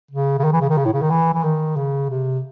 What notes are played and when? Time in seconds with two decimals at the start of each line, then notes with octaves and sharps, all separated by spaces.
0.11 C#3
0.39 C#3
0.44 D#3
0.53 E3
0.61 C#3
0.70 D#3
0.78 C#3
0.85 A2
0.93 C#3
1.02 D#3
1.10 E3
1.34 E3
1.44 D#3
1.77 C#3
2.10 C3